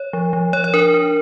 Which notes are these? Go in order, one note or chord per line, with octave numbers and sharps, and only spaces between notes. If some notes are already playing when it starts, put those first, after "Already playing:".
Already playing: C#5
F3
F3
F3 C#5
C#5
D4 A#4
D4